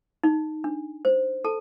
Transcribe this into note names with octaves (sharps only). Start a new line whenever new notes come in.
D#4
D4
C5
A4 A5